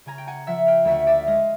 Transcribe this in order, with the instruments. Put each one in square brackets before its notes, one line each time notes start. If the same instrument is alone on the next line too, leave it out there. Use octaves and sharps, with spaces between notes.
[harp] C#3 G#5 A#5
G5
F#5 G#5
F3 E5 F#5
F5 G5
D2 E5 F#5
D5 E5
G#3 D#5 F5